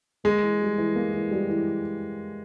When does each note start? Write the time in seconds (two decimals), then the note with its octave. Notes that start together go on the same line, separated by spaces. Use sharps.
0.24 G#3 A#3
0.42 E3
0.60 G3
0.78 E3
0.95 A#3
1.14 E3
1.31 G3
1.50 E3